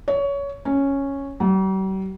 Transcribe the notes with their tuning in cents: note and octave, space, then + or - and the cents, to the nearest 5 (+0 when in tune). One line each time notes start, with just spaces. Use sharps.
C#5 +20
C#4 -5
G3 -45